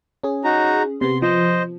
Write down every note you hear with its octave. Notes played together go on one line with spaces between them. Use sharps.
C#4 G#4
D#4 F#4 A#5
C3 B3 C6
F3 C5 D#5